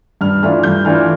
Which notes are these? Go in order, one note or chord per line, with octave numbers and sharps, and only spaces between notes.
G2 F6
E3 A3 D4 F4 F6
G2 G6
E3 A3 D4 F4 F6